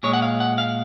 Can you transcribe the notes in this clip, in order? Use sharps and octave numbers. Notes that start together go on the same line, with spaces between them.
A#2 G#3 C#5
F#5
F5
F#5
F5